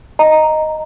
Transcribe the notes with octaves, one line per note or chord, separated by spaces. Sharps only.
D#5 A#5